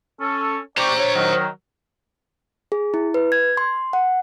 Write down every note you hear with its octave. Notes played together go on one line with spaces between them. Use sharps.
C#4 A4
G4 C5 D5 A#5 C#6
C#5
D#3 F#3 A#4
G#4
E4
B4
G#6
C6
F#5